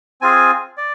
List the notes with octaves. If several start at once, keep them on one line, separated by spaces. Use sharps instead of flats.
C4 F4 G#4 G#5
D5